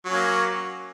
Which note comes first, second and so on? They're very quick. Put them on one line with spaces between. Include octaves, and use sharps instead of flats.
F#3 C#4 A#3